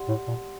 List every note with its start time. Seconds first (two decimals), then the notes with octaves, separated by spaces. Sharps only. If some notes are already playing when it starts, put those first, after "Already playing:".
Already playing: G4 D5 F#5 C6
0.08 A2
0.28 A#2